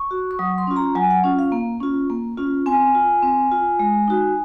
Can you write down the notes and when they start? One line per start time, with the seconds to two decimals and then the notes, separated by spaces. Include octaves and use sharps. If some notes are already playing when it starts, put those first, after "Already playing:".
Already playing: C#6
0.11 F#4
0.31 C#6
0.39 F#3 D#6
0.58 C6
0.67 C#4 F4
0.76 A#5
0.95 F#3 G#5
1.11 F#5
1.24 C#4 F4
1.39 F5
1.52 A#3
1.81 C#4 F4
2.10 A#3
2.38 C#4 F4
2.66 C4 G#5
2.95 F4
3.22 C4
3.51 F4
3.79 G#3
4.08 D#4 F#4